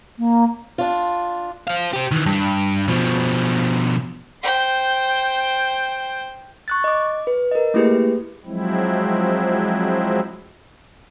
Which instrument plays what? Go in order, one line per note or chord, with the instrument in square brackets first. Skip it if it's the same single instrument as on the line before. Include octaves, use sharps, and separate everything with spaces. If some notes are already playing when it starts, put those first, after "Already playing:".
[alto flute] A#3
[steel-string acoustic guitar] D4 F4
[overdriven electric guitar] C5 F5
G4 C5
D#3 E3
G2
B2 F3
[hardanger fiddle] C5 G5
[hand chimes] C#6 F#6 A6
D#5 D6
B4
A#4 D#5
A3 A#3 E4 G4 G#4 B4
[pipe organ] F3 F#3 G#3 C4 E4